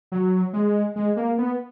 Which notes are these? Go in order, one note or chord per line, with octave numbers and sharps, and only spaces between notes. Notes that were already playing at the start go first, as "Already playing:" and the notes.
F#3
G#3
G#3
A#3
B3